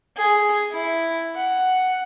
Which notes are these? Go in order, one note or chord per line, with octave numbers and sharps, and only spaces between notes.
G#4
E4
F#5